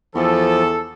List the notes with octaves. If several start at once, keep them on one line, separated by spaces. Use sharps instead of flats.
E2 F3 A4